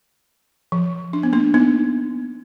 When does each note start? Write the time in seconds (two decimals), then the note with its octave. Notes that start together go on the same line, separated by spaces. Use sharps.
0.72 F3
1.13 D4
1.23 B3
1.33 A#3 D4
1.54 B3 D#4